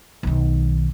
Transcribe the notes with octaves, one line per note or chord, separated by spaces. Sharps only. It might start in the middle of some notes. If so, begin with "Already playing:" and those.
B1 D#3